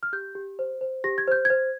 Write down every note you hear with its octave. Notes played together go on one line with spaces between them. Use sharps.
F6
G4 G6
G4
C5
C5
G4 A#6
G#6
C5 G6
G#6
C5